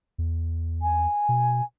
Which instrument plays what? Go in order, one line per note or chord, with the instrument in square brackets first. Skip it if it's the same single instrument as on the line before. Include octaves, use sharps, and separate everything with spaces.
[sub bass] E2
[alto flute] G#5
[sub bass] B2